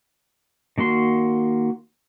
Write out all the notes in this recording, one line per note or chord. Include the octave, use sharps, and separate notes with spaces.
D#3 A#3 F#4 C6